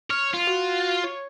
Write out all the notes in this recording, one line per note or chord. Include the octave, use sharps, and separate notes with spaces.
C#5 F6
F4
F#4
C#5